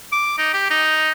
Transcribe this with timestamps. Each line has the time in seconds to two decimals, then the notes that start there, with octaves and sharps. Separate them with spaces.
0.12 D6
0.38 D#4
0.54 G4
0.70 D#4